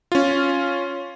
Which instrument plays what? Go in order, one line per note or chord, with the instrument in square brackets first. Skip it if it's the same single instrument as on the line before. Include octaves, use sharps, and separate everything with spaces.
[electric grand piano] C#4 F4